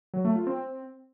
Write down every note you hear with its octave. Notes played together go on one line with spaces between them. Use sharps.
F#3
A3
F4
C4